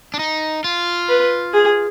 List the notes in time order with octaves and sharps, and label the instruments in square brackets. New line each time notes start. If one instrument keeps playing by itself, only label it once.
[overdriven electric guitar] D4
D#4
F4
[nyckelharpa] B4
G#4